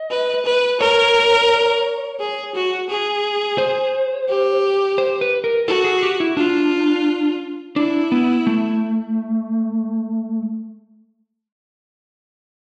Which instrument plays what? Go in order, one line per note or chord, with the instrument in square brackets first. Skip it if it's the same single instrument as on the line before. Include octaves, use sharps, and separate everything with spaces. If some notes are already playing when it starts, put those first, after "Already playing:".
Already playing: [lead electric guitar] D#5
[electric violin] B4
B4
[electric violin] A#4 [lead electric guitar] C#5
[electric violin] G#4
F#4
G#4
[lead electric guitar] C5
[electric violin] G4
[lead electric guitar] C5
B4
A#4
[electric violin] F#4 [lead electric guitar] A4
[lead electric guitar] G#4
G4
E4
[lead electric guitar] D4 [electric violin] F4
[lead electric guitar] D4 [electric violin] E4
[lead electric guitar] B3
A3